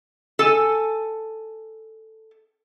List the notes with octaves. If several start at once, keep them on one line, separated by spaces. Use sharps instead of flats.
A4 G#5